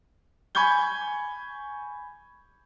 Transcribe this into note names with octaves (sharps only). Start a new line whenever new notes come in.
G#5 B5 C#6 G6 G#6 G7